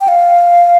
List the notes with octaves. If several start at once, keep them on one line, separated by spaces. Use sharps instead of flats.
G5
F5